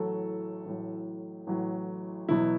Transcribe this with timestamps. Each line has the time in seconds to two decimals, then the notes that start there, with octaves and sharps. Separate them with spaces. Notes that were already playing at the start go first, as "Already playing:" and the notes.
Already playing: A1 A2 F#3 A4
0.65 A1 A2 F#3
1.47 A1 A2 F#3
2.29 E2 B2 F#3 E4